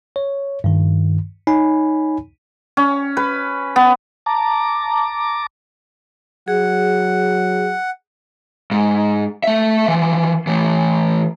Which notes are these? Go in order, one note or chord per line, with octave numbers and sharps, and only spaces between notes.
C#5
G2 D#3
D#4 C#5 G#5 B5
C#4
B4
B3
A5 A#5 D6
F#3 G#4 F#5
G#2
A3 E5
E3 F3
E3 A3